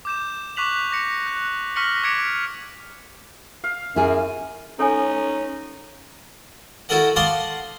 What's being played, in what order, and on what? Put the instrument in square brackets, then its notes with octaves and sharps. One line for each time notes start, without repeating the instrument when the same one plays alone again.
[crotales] D6 G6 E7
C#6 D6 F#6 B6 F7 F#7
D6 A#6 C#7
F#6
C#6 F6 A#6 B6 C#7 F#7
D6 G#6 B6 C#7 D7 F7
[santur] F5
[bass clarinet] F#2 [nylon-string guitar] E4 G#4
[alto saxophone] C#4 [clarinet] D#4 [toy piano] A4 C#5 G#5
[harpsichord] E4 F#4 A4 A#4 D#5 F#5
D#5 F5 F#5 A5 C6 D6